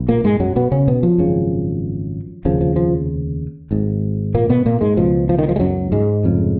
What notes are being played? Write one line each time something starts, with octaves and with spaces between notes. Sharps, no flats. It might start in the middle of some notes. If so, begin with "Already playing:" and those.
Already playing: B1
A#2 A#3
G#2 G#3
F#2 F#3
B2 B3
C#3 C#4
B2 B3
F3
G#1 F#2 C#3
F1 D#2 C#3 F3
F3
F3
G#1 G#2
A#2 A#3
B2 B3
A#2 A#3
G#2 G#3
C#2 B2 F3
F3
D#3
F3
G#3
F#2 F#3
G#2 G#3
F1 F2 C#3